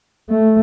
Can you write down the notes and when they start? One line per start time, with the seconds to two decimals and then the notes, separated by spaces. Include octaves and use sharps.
0.30 A3